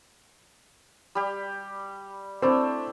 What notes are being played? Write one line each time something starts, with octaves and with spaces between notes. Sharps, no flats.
G3 G4
A3 C4 D4 E4